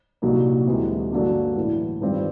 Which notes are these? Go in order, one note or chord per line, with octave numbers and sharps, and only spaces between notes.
C2 A#2 F#3 A#3 D#4
D2 C3 E3 G#3
G2 D3 F#3 A#3 D4
A2 E3 G3
G2 D#3 G3 C4 F4